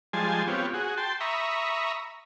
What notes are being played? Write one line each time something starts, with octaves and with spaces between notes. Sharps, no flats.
F3 G3 G#3 G#5 A5 C6
B3 C4 F4 G4 C#5
F#4 G#4
G5 A5 C6
E5 A#5 B5 C#6 D#6